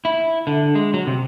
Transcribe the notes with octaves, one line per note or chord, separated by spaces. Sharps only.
E4
D3
G#3
F#3
C3